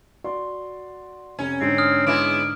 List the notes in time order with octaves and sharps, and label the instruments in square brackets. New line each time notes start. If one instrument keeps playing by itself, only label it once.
[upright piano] F#4 D5 C6
[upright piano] F1 [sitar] C#4
[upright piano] G#2 D3 [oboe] C4
[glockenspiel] D#6 F6
[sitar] G#3 B3 E4 [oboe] D6